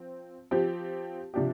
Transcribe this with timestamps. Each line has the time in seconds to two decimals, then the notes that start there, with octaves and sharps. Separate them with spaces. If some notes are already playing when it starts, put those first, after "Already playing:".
Already playing: F3 C4
0.51 F3 C4 G4
1.34 C3 F3 D4 G4